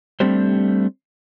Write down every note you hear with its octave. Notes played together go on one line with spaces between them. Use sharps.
G3 A3 C4 D4 G4 C5